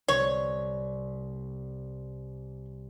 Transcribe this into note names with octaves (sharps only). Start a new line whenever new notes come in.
C2 C#5